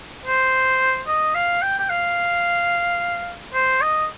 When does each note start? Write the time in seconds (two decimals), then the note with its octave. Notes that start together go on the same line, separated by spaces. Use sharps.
0.25 C5
1.07 D#5
1.35 F5
1.62 G5
1.79 G5
1.90 F5
3.54 C5
3.81 D#5